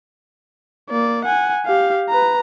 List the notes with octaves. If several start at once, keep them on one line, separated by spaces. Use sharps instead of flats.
A#3 D5
F#5 G#5
G4 F5
B4 A#5